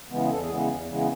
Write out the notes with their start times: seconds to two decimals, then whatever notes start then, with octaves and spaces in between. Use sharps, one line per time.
0.10 C#3 E3 G#3 B3
0.29 E2 A4
0.42 G#4
0.49 C#3 E3 G#3 B3
0.68 E2
0.88 C#3 E3 G#3 B3